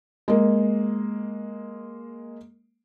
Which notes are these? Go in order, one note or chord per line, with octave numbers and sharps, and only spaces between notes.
G#3 A#3